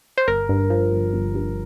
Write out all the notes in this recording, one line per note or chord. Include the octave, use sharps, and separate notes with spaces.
C5
G1 A#4
G2
F3
G1
G1
G2